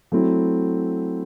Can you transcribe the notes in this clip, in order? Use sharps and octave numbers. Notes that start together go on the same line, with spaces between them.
F#3 A3 C4 E4